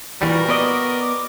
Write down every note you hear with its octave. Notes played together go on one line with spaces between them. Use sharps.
A#2 E3 G3 F#4 A#4
B3 D5 D#5
D6